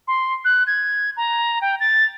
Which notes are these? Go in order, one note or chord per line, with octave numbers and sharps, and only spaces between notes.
C6
F#6
G#6
A#5
G5
A6